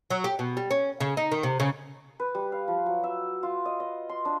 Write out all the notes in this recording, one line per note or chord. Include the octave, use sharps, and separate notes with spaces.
F#3
G4
B2
G3
C#4
C#3
D#4
D#3
C3
C#3
B4
G3
F5
F3
F#3
E5
F4
D#5
D#5
C6
D4